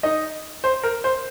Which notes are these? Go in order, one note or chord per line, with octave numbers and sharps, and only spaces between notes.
D#4 D#5
C5
A#4
C5